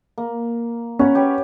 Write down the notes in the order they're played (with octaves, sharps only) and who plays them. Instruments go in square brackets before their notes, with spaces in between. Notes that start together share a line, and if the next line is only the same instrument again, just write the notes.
[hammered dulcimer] A#3
[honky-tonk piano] C#4 [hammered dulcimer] F#4 A#5 B5
[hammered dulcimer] G4 B4 C#5